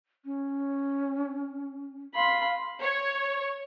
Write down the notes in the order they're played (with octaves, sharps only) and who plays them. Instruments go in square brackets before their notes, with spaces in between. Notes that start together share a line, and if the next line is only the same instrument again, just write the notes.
[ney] C#4
[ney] F5 [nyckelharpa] B5 C6
[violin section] C#5